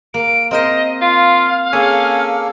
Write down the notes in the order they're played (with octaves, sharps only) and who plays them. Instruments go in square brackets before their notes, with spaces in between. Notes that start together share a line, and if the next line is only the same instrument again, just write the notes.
[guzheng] A#3 [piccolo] D7
[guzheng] C4 A#4 C5 [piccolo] D#5
[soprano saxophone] F4 [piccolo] F5
[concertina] A#3 A4 [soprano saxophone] C#4 [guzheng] G#4